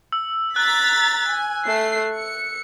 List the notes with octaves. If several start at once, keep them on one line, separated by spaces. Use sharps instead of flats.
E6
A#5 F#6 A6 B6
G#5
A3 C7
C#7